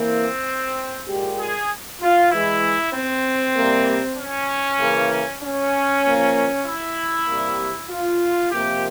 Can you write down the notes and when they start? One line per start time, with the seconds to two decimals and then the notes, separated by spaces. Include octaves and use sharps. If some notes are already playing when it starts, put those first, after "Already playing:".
Already playing: E3 A#3 C4
1.08 A#2 G#3 G4
1.39 G#4
2.02 F4
2.31 E3 G#3 E4
2.93 C4
3.56 C3 G3 A#3
4.17 C#4
4.80 C#3 E3 A#3
5.42 C#4
6.04 A#2 F3 A#3
6.65 E4
7.28 C3 G3 A#3
7.90 F4
8.52 C3 F3 A#3 G4